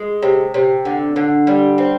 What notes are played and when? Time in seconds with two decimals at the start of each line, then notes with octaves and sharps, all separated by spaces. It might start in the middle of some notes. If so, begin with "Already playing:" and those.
Already playing: G#3
0.23 C3
0.54 C3
0.85 D3
1.16 D3
1.47 G3
1.78 C4